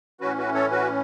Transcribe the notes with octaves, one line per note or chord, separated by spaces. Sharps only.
A2 E3 C#4 F#4 B4
F#4 B4
A4 C#5
F#4 B4